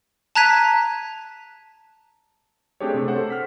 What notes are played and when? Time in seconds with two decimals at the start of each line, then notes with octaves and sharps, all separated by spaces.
0.35 A5 A#5 F#6 G#6 B6 D#7
2.80 A3 C4 D4 G4 G#4 C#5
2.94 C3 A3
3.08 A4 C5 F#5
3.30 F6 B6